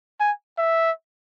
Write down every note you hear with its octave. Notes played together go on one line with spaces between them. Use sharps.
G#5
E5